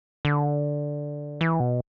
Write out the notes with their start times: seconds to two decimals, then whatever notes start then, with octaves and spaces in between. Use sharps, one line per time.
0.25 D3
1.41 E3
1.60 B2